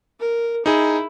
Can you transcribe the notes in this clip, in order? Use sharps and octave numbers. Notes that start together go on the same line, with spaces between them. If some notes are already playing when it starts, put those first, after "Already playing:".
A#4
D#4 E4 G#4